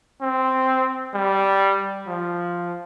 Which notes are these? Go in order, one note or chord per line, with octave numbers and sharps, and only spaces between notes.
C4
G3
F3